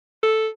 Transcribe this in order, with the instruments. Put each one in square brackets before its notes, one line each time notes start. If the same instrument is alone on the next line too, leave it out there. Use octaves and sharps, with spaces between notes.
[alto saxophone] A4